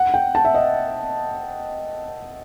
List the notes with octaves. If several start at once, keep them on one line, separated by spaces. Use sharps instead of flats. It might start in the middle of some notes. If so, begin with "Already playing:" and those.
Already playing: F#5
G5
A5
E5
D#5